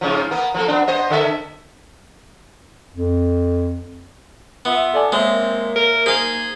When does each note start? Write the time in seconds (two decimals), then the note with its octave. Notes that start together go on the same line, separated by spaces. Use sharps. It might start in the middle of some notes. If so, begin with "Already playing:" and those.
0.01 G#2 C#3 F3
0.31 A#3 B3
0.54 F3 A#3 A4
0.68 B3 D4
0.88 B3 C5 D#5
1.10 D3 A4 E5
2.94 F2
4.65 B3 F4 E5
4.93 A4 D5 G#5
5.12 G#3 A#3 C4 C#5 E5
5.76 A#4
6.06 D#4 G#4 C5 F5 G#5